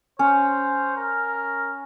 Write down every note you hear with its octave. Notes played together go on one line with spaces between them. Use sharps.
C#4 C5
A#4